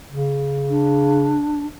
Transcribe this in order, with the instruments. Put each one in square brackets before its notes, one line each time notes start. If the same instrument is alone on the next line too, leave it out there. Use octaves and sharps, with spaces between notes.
[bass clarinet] C#3
[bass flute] D4